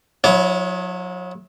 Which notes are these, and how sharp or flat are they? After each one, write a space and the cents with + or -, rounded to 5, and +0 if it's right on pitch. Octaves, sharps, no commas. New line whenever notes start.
F#3 -40 E4 +0 C#5 +20